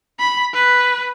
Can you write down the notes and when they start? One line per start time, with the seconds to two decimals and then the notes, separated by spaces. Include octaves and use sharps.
0.19 B5
0.54 B4